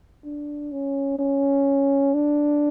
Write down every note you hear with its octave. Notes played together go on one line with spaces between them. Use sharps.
D4
C#4
C#4
D4